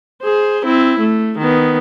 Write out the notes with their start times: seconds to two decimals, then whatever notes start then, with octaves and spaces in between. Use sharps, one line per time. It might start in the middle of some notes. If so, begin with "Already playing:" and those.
0.23 G#4 C5
0.65 C4 E4
1.00 A3
1.38 D#3 B3